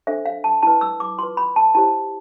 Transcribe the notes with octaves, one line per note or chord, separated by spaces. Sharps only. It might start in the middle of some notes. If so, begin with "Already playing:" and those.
D4 A4 C5 E5
F5
A5
E4 B4 A5
E6
D6
F4 B4 C6
B5
A5
E4 G4 C5 A5